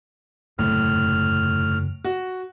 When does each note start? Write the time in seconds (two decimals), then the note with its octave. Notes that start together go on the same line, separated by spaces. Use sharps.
0.59 F#1 E2 A2 C3 F6
2.05 F#4